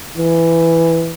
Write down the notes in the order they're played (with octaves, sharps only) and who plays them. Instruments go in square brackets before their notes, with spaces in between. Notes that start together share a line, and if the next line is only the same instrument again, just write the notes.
[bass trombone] E3